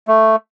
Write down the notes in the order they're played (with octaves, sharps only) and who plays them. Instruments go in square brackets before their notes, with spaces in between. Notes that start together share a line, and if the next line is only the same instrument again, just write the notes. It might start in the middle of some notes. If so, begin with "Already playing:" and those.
[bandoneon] A3